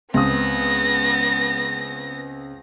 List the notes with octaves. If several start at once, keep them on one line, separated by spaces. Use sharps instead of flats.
C#2 B3 C4 D#6 A#6